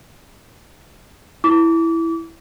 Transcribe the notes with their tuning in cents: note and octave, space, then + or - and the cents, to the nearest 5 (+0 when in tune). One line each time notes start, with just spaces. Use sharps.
E4 +0 D6 -30